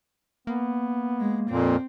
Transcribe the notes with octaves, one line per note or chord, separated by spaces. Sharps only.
A#3 B3
G#3
F2 A#2 C4